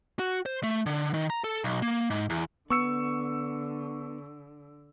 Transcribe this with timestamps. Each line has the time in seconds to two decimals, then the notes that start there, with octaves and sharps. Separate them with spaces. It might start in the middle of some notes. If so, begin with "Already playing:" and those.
0.19 F#4
0.46 C5
0.63 A3
0.86 D3
1.13 D#3
1.30 A#5
1.44 A4
1.64 B1
1.82 A#3
2.10 G#2
2.30 E2
2.70 D3 B3 C#6 E6 C#7